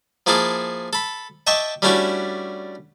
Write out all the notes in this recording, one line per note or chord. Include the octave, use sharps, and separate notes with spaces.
F3 A#3 E4 G#4 A4 F5
A4 B5
D#5 E5 G5 A5 C#6 D6
G3 A3 C#4 D4 E4 F#4